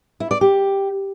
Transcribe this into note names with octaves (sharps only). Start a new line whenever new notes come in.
E4
D5
G4